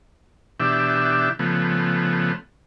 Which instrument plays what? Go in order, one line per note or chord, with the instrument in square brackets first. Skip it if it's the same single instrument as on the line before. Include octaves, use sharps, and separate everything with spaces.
[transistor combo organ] B2 E3 D4 G4 E5
C#3 F3 A3 B3